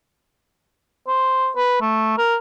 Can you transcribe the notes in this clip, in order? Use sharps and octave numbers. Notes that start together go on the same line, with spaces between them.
C5
B4
A3
A#4